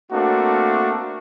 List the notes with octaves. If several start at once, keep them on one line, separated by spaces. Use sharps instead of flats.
A3 A#3 C4 D4 F#4